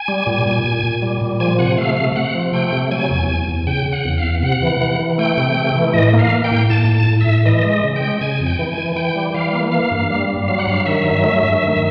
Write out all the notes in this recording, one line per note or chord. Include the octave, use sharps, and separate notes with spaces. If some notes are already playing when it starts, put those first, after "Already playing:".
Already playing: G#5
G3
A#2
A#2
A#2
A#2
G3
A#2
F3 G#5
C3 F#5
A3 F5
C3 F5
C3 F#5
F3
A3 G5
C3
F#3 G#5
E2
E2
E2
C#3 G5
C#3
F#5
E2
F5
E2
C3 F#5
E3
E3
E3
A3 G5
C3
A3
E3
A2 D#5
A#3
F5
A#3
G5
A2
A2 A5
A2
A5
A2
E5
A2
E3 D#5
G#3
D#5
C#3
G5
G#3
C#3 G#5
F2
G5
E3
G#5
E3
E3 G5
G3
E3 F5
A#3
A#3 F5
G2
G3
G3
F#3 F5
F#5
G2 F5
D#3 E5
F#3
A3
G2
D#3